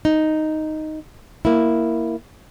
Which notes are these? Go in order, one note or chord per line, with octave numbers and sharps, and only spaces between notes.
D#4
A#3 E4